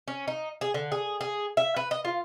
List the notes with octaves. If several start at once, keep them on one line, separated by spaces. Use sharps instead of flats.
C#4
D#4
G#4
D3
G#4
G#4
E5
B4
D#5
F4